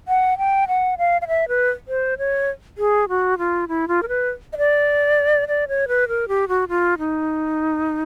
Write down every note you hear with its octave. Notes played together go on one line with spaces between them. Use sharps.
F#5
G5
F#5
F5
F5
E5
B4
C5
C#5
G#4
F#4
F4
E4
F4
A#4
B4
D#5
D5
D5
C#5
B4
A#4
G4
F#4
F4
D#4